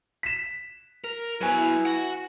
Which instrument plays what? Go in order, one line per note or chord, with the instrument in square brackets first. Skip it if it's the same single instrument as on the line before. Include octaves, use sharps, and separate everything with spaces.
[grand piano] B6 E7
[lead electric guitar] A#4
[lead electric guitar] F#3 B3 [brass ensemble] E4 [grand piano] B4 G#5
[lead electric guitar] F#4 F#5